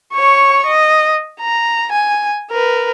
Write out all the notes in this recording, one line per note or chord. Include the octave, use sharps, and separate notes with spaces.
C#5 C#6
D#5
A#5
G#5
A#4 B4